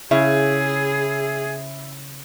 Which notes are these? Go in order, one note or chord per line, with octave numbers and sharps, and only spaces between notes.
C#3 E4 G#4